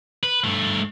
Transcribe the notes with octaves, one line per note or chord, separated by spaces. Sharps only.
B4
G2 A3